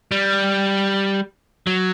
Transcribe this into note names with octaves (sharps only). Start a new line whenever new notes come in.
G3
F#3